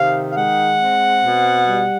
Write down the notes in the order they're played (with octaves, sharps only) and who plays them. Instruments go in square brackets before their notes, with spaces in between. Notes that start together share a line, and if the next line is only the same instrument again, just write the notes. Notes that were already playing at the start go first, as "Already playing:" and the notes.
Already playing: [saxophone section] C3 D#3 F5
F5
G#3 F#5
C4
B2
G3